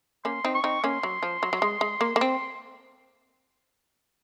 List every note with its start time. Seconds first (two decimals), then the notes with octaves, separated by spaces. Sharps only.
0.25 A#3 C#4 C6
0.45 C4 D#4
0.55 C#6
0.64 C4 D#4
0.84 A#3 C#4 C6
1.03 F#3
1.23 F3
1.43 F#3
1.53 F#3
1.62 G#3
1.81 G#3
2.01 A#3
2.16 A#3
2.21 C4